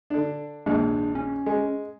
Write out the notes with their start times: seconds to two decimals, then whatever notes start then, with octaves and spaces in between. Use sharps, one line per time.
0.10 D3 D4
0.66 A#1 D#2 G#2 D4
1.15 C#4
1.46 G#3